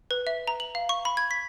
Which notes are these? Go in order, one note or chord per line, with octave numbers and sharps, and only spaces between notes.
B4
E5
A#5
F#7
F5
C#6
B5
G#6
B6